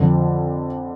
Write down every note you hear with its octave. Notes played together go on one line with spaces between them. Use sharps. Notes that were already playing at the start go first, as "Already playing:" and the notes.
Already playing: F2 D3 F3